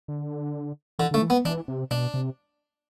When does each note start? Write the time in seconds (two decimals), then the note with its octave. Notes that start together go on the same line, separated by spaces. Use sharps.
0.08 D3
0.99 D3 E3
1.11 D3 A3
1.22 E3
1.30 B3
1.45 E3 D4
1.68 C3
1.91 B2 D4
2.14 C3